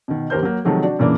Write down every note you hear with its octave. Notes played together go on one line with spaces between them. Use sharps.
B2 D#3
D#2 G4 A#4 C5 G6
F#3 A#3
C3 D#3 F3 F#3 G#3 A3
D4 F#4 D5
F#2 A#2 C#3 E3 A#3 D4